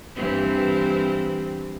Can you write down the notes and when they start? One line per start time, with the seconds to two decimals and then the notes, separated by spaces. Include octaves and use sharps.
0.15 G2 E3 C4